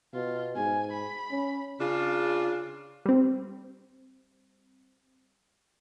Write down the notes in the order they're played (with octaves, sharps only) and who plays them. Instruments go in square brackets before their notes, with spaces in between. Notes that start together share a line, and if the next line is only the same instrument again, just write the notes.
[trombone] B2 [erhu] F4
[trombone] G#2 [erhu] G#5
[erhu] B5
[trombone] C#4
[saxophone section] C#3 D4 F4
[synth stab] G3 C4